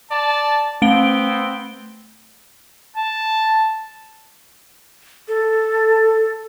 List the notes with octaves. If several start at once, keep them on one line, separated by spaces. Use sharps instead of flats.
D5 A5
A3 B3 C4 D7 G7
A5
A4